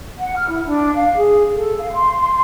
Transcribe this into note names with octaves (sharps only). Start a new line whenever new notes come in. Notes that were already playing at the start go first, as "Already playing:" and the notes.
F#5
F6
E4
D4
F5
G#4
A4
F5
C6
C6